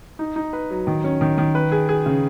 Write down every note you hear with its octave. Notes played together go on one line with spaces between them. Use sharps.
D#4
D#4
B4
F#3
D#3
C#4
D#3
D#3
B4
G#4
G#4
C#3